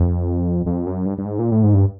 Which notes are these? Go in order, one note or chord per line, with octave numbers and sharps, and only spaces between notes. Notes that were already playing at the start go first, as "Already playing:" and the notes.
Already playing: F2
F2
F#2
G2
G2
G#2
A#2
A2
G#2
G2